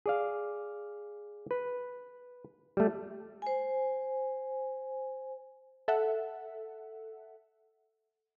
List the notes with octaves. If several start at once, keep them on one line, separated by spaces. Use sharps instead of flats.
G#4 D5 F5
B4
G3 A3
C5 G#5
A4 E5 F#5